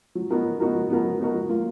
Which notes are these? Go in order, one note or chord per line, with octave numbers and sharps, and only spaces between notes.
F#3
B3 D#4 F#4 A#4
F#3
B3 D#4 F#4 A#4
F#3
B3 D#4 F#4 A#4
F#3
B3 D#4 F#4 A#4
F#3
A#3 F4